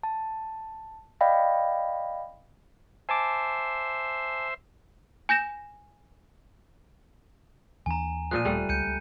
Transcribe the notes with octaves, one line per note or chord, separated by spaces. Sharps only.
A5
D5 D#5 F5 G5 B5 A#6
C5 E5 G#5 A5 D6
G#5 G6 A#6 E7
D#2 E3 D4 G#5 A#5
A#2 F3 F#6 D#7
D#1 G3 A3
C#2 G6 C#7 D#7
C#2